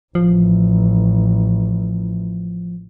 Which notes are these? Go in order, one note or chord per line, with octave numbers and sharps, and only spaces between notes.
A1 F3